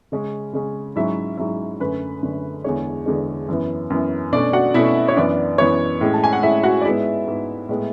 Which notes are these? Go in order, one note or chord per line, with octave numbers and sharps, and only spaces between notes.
C#3 G#3 C#4
C#3 G#3 C#4
G#2 F#3 C#4 E4 E5
G#2 F#3 C#4 E4 E5
F#2 D3 A3 C#4 B4
F#2 D3 A3 C#4
E2 D3 G#3 C#5
E2 D3 G#3
F#2 E3 B3
F#2 E3 B3
B2 A3 C#4 D4 D5
F#4 F#5
B2 A3 C#4 E4 E5
C#5
F#2 E3 B3 D4 D5
F#2 E3 B3 C#5
A2 G#3 C#4
A5
G#5
F#5
A2 G#3 C#4 E4 E5
F#4 F#5
D5
G#2 G#3 B3 E4 E5
G#2 G#3 B3
A2 G#3 B3